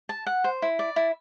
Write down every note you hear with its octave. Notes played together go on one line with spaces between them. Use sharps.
A5
F#5
C5
E4
D5
E4